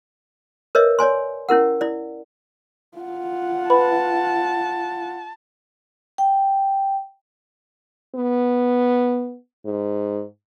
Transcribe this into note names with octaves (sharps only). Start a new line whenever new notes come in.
A#4 B4 C#5 D#5 E5
C#5 D5 G#5 C6
C#4 E4 A#4 F#5
E4 D5
F4 F#5
B4 A5 B5
G5
B3
G#2